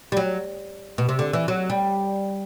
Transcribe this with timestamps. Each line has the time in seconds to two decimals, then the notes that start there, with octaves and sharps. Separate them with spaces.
0.12 G3
0.17 F#3
0.98 B2
1.09 C3
1.19 D3
1.33 E3
1.48 F#3
1.70 G3